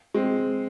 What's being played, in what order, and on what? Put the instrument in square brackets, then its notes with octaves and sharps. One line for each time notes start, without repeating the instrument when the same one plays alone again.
[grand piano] G#3 C4